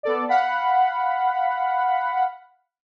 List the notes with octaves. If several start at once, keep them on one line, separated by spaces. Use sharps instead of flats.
B3 A4 D5
F5 F#5 B5